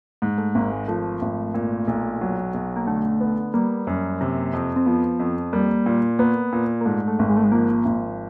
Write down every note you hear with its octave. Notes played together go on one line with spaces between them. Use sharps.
G#2
A3
G#1 A#3
G#3
F3 A3
G#1
A#2
B1
F#3
B1
A#3
D3 A3
B3
G3 A#3
F#2
C3
F2
C4
F3 B3
F2
G3 A#3
A#2
A#3 B3
A#2
A#3
G#2 A3
A3
G#1
G#3
A3
G#3
F3 A#3
G#1